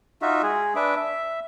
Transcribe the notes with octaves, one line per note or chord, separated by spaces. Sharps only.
D#4 F4 F#4 E5
G#3 G#4
D4 B4 E5 D6
E5